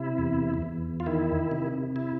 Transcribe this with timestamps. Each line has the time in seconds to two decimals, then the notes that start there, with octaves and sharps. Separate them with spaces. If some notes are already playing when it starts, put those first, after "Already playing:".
Already playing: C3 E4
0.18 E2
0.62 E2
1.00 F4
1.06 D#3 E4
1.51 C3
1.96 E4